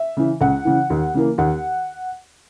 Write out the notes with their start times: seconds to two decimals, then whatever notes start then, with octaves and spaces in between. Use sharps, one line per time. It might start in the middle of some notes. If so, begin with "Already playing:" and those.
Already playing: E5
0.17 C#3 E3
0.41 C#2 F#5
0.65 C#3 E3
0.90 D#2
1.14 C#3 E3 A#3
1.38 D#2 F#5